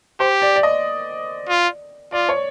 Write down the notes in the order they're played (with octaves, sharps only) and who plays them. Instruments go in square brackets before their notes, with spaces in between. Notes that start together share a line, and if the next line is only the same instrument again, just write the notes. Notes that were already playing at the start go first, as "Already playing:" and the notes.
[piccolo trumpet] G4 [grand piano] C5
[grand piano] D5
D5
D#5
[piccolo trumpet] F4
[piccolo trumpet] F4 [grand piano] D5
[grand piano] C#5